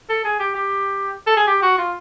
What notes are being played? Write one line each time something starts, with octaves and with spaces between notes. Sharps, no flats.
A4
G#4
G4
G4
A4
G#4
G4
F#4
F4